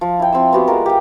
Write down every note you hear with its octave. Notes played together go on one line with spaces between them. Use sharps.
F3
E4 G5
F3 C4 C6 E6
B3 F#4 G4
G#3 F4 A#4
G4 G5